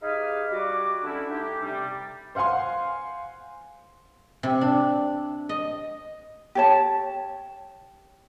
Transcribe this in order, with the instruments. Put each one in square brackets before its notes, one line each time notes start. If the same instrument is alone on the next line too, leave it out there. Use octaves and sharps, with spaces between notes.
[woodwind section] D#4 G4 G#4 B4 F5
G3 F#4 D6
D3 C#4 D4 E4
A3 D4 D#4 G4
C3 G3
[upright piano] C5 F5 F#5 G#5 C6
[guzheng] C3
D4
D#5
[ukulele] G4 C#5 A5